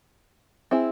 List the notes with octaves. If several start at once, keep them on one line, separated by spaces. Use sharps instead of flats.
C4 E4 G#4